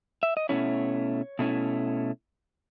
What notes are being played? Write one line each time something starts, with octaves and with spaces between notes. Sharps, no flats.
E5
D#5
B2 A3 C#4 E4 C#5
B2 A3 C#4 E4